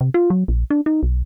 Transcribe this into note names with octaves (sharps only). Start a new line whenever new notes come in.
C3
F4
F#3
A#1
D4
D#4
B1